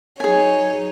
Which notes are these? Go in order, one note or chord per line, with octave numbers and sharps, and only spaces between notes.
F#3 D#4 G#4 C#5 G#5